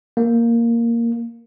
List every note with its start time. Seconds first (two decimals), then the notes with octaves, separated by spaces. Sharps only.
0.17 A#3